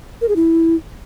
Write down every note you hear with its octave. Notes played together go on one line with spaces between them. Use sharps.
A#4
G#4
E4